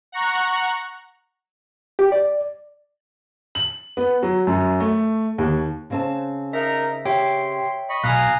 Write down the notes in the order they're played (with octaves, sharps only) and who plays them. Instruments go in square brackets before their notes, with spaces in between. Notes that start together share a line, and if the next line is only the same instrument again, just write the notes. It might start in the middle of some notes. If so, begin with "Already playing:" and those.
[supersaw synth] F#5 A#5 C#6 F#6
[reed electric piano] G4
D5
[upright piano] F#7
B3
F#3
F#2
A3
D#2
[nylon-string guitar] C#3 C4 A5
[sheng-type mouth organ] D#4 A#4 A#5 [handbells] E5
[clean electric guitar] G4 [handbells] C#5 E5 G5 [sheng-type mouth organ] C6
[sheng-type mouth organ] D#5 B5 C#6
[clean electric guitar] B1 [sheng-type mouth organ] F5 A#5 [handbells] G#5 D#6 F#6